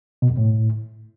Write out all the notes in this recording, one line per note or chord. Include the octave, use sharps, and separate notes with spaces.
B2
F2
A2